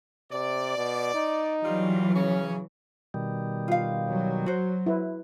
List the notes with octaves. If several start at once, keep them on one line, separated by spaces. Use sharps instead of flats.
C3 D5
B2
D#4
E3 F#3 G3 F4
C#3 C#4
B2 D#3 G3
F4 F5
F#3
F#4 C5
E4 B4